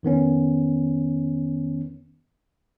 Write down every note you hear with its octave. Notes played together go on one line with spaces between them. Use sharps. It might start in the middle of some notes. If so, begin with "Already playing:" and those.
F2 D#3 B3 C#4